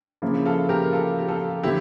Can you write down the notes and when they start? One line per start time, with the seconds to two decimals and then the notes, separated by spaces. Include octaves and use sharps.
0.22 C#3 F3 A#3 E4
0.46 F4 A4
0.69 G4 A#4
0.92 F4 A4
1.19 G4
1.28 F4 A4
1.63 D3 F3 E4 G4